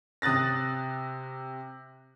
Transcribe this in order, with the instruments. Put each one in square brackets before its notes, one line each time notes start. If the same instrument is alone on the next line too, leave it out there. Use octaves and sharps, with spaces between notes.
[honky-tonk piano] C3 D#6 F#6 A6 A#6